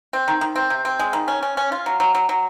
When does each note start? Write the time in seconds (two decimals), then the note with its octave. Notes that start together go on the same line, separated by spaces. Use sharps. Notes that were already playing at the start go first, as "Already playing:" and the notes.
0.13 C4
0.28 D#3
0.41 D#3
0.56 C4
0.70 C3
0.85 C4
0.99 G#3
1.13 D#3
1.28 C#4
1.43 C#4
1.57 C#4
1.72 F4
1.86 F#3
2.00 F#3
2.15 F#3
2.29 F#3